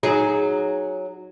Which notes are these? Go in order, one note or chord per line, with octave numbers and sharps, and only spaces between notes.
F#3 D#4 G#4